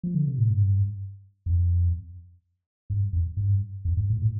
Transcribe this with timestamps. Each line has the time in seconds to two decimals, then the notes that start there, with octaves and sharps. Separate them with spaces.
0.03 F3
0.15 D3
0.27 C3
0.38 A2
0.50 G2
1.46 F2
2.90 G2
3.13 F2
3.37 G2
3.85 F2
3.97 G2
4.10 A2
4.22 A2